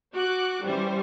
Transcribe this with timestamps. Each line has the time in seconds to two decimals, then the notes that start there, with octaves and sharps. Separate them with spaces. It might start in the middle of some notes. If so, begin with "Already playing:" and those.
0.13 F#4 D6 F#6
0.64 E3 G3 C#4 C5